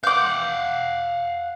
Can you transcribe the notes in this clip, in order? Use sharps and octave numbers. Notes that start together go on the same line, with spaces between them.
F5 F#5 D6 G6